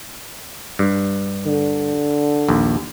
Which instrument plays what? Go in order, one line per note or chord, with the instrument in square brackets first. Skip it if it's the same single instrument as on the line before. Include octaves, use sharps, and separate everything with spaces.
[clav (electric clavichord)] G2
[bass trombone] D3
[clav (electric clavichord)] A#1 D#2